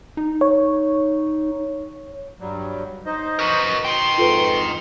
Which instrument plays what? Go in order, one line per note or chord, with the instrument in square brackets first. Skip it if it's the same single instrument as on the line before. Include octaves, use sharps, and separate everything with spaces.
[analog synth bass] D#4
[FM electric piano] C#5
[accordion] G2 F#3 G3
D#4 C5 D#5
[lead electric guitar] F#4 A#4 [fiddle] B4
[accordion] B2 [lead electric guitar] D#5 G5 [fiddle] C6
[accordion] F2 G#2 [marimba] F4 A4 B4